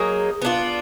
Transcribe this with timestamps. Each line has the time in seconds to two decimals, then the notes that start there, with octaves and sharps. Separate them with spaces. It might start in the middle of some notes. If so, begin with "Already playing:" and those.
Already playing: F#3 A#3 D#4 G#4
0.42 B3 D4 F4